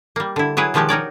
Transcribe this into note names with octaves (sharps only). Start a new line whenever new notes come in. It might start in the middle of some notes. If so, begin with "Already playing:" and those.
G3 A#3
D3 E4
F#3 E4 G#4 B4 C#5
B2 D#3 F3 G#3 F#4 G4
D#4 A#4 C#5 D5